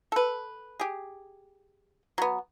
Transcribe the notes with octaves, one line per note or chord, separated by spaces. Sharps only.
A4 B4
G4 G#4
F#3 B3